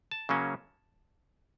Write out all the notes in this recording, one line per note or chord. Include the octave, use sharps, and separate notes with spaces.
A5
C#3 F#3 A#3 C#4